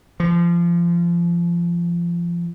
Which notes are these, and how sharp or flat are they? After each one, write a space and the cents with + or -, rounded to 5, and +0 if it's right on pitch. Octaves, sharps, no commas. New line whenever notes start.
F3 -25